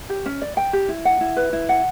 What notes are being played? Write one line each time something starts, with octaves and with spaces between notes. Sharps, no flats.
G4
C#4
D5
G5
G4
E4
F#5
E4
B4
E4
F#5